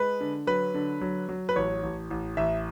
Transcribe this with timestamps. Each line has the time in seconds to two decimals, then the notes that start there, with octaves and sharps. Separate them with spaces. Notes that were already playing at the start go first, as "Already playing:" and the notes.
Already playing: G#3 B4
0.20 D3
0.47 F#3 B4
0.74 D3
1.01 F#3
1.29 F#3
1.49 B4
1.56 A1 C#5
1.83 A1
2.10 A1
2.37 A1 E5